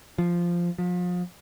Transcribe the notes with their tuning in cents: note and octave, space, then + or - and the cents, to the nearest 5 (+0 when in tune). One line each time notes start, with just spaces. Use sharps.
F3 -5
F3 +35